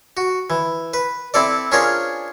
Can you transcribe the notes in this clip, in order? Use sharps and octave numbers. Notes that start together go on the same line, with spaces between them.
F#4
E3
B4
C4 E4 A4 D5
C#4 D4 F4 G#4 A#4 C5